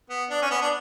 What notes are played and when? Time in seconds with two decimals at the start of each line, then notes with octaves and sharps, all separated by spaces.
0.10 B3
0.30 D4
0.42 C#4
0.51 B3
0.61 D4